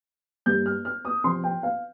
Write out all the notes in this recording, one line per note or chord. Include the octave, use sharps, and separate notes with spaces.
G2 G3 A#3 G6
F6
F6
D#6
C3 F3 C4 C6
G5
F5